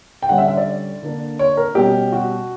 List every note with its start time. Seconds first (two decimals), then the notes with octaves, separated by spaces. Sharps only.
0.23 G5
0.29 D3 G3 C#4 F#5
0.38 E5
0.48 E5
0.57 D5
1.02 D3 A#3 D4
1.39 C#5
1.57 A#4
1.75 B2 G3 C#4 G4
2.12 F#4